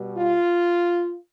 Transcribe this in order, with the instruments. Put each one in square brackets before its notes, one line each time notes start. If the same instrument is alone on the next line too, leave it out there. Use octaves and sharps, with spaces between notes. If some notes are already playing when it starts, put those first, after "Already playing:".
Already playing: [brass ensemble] B2 G3
F4